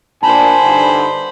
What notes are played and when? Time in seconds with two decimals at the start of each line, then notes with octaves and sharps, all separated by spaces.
0.23 A#2 D4 C5 G#5 A5 B5
0.62 G2 D3 D#4